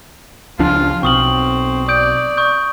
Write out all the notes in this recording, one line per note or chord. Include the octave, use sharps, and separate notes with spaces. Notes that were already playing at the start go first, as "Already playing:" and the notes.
C#2 F3 D4 F4
B1 C4 C#6 D#6 F#7
D5 D#6 G6 D7
C#6 D#6 G6